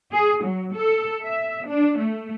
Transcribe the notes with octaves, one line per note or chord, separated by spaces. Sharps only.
G#4
F#3
A4
E5
D4
A3